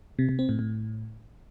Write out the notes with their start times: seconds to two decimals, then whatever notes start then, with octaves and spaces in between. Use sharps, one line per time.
0.19 C3
0.29 C3
0.39 C4
0.49 A2
0.59 A2